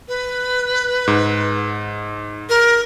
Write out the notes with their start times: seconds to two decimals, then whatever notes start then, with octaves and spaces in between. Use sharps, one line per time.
0.08 B4
1.08 G#2
2.49 A#4